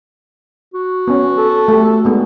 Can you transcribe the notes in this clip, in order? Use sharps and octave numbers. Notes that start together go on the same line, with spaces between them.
F#4
B3 C#4
A4
A3 G4
G#3 B3 D#4